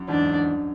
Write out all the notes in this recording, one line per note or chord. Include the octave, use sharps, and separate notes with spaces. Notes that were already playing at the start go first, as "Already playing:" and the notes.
Already playing: F#2
E2 G#2 D4
F#2